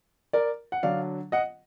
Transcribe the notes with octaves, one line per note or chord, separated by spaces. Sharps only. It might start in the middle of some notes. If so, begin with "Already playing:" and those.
A#4 D5
F#5
D3 F#3 D4 D5 F5
D#5 F#5